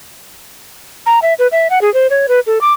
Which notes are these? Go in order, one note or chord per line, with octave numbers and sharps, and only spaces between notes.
A#5
E5
B4
E5
F#5
G#4
C5
C#5
B4
A4
D6